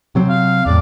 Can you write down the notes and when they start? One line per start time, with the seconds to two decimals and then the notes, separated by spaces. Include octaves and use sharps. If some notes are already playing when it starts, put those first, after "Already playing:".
0.15 C3 F#3 C4
0.29 F5
0.66 E2 A2 D5